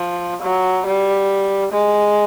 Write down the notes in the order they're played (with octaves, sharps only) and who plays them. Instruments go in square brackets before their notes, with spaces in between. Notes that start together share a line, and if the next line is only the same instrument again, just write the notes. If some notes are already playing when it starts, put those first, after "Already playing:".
Already playing: [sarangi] F3
F#3
G3
G#3